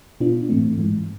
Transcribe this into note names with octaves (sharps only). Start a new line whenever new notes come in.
B2 B3 D4 F4
A2 E3 A3 C4
G#2 E3 G#3